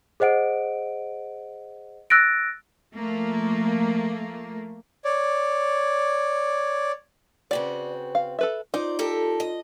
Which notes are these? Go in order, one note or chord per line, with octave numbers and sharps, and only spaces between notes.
G#4 C5 D#5 F#5 D7
E6 F#6 A6 A#6 D7
F3 A3 A#3
C#5 D5
C#3 C4 F#4 B4 D5
F5
A4 B4 E5
D#4 F4 C5 D5
G4 A4 A#4
D#5